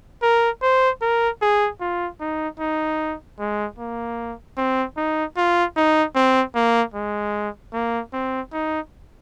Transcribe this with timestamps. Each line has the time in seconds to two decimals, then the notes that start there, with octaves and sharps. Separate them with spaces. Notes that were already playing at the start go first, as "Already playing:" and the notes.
0.22 A#4
0.62 C5
1.02 A#4
1.42 G#4
1.81 F4
2.20 D#4
2.60 D#4
3.39 G#3
3.78 A#3
4.57 C4
4.97 D#4
5.37 F4
5.76 D#4
6.15 C4
6.55 A#3
6.94 G#3
7.73 A#3
8.13 C4
8.52 D#4